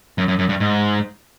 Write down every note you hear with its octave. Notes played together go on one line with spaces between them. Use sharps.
F#2
F#2
F#2
G2
G#2